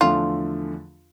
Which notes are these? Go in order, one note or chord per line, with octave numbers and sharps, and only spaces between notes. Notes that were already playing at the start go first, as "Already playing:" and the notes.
E2 D3 F3 A3 D4 F4